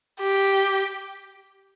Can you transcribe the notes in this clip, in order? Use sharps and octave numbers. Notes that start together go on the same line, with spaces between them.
G4